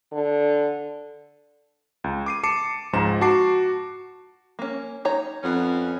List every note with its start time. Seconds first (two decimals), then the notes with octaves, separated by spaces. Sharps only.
0.13 D3
2.04 C#2
2.26 D6 C7 D#7
2.43 A5 D6 C7 C#7 E7
2.93 C#2 G#2 F3 A#5 E7
3.21 F#4 A5 D6 C7
4.59 A#3 C#4
5.05 D#4 C#5 A#5
5.43 F2 B3 C#4